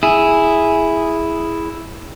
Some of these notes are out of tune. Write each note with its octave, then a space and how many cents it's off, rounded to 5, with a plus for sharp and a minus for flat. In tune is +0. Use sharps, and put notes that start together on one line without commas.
E4 +0 G#4 +0